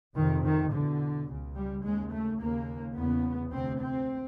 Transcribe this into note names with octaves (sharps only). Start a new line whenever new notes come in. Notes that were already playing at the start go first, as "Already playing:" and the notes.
F2 C3 D#3
D#3
E2 B2 D3
C#2 C#3
G3
D#2 C#3 G#3
A3
D#2 C#3 A#3
E2 C#3 B3
D2 C3 C4
C4